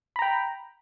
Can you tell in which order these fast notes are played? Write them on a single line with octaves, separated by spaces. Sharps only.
B5 A#5 G5